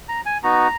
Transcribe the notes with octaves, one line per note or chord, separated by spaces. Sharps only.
A#5
G#5
B3 D#4 F#4 A#5